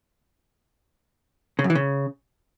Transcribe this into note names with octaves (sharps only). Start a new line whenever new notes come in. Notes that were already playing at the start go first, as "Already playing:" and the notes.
C#3
F#2
E3
C#3